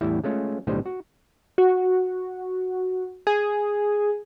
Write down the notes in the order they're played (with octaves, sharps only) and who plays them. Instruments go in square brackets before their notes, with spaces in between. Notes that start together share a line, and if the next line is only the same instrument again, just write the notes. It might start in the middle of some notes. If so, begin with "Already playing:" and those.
[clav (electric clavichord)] E2 A2 G3 E4 E5
G#3 A3 C#4 F4
B1 A2 D3 G3 C5 D#5
F#4
[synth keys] F#4
G#4